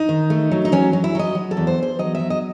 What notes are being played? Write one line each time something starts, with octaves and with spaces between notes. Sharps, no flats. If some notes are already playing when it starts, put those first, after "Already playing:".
Already playing: D#4
D#3
A3
F#3
D#4
F#3 C#4
F#3
E4
F#3 D#5
F#3
A4
E2
C5
E2 C5
F#3 D#5
F#3 E5
D#5